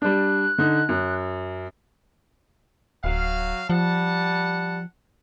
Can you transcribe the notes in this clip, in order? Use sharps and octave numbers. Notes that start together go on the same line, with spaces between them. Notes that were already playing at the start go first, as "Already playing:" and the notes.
G3 D4 F#6
D3 D#4
F#2
D1 F#3 F5
F3 G3 F#5 A5